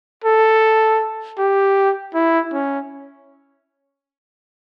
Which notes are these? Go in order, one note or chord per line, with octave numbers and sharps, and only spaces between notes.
A4
G4
E4
C#4